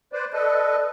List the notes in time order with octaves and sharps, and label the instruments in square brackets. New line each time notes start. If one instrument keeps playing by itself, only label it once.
[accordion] B4 C5 D5
[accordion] A4 B4 D#5 [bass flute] D5